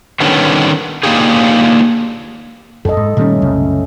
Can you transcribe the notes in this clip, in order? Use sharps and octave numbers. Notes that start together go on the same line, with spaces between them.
D3 D#3 G3 B3 C#4 D4
A#3 D4 D#4 F4 G4 G#4
A1 F#2 A4 D#5
G#2
A#2 D#3 G3 A3 C#4
C2 F#2 C#3